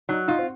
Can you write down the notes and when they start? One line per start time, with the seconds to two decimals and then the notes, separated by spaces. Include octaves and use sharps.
0.09 F#3 D#4
0.28 D#4 F4
0.39 C4